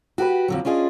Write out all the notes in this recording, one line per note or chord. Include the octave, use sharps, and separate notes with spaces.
F#4 G4 A4 B4
F2 D3 F#3
C#4 D4 F4 G#4 D#5